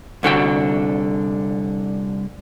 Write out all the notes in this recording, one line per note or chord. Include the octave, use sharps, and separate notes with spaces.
C2 D3 F#4 G5